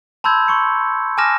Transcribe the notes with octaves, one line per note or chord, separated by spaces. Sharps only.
A5 B5 C6 E6 G6 G#6
C6 C#6 C#7
G#5 A5 D6 F6 A#6 E7